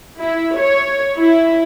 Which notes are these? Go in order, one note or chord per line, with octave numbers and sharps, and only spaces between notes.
E4
C#5
E4